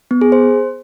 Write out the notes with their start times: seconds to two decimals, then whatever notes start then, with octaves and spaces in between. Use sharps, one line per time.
0.11 B3
0.21 G#4
0.32 C5